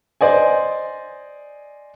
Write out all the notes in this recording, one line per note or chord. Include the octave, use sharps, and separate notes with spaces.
C5 D5 D#5 G#5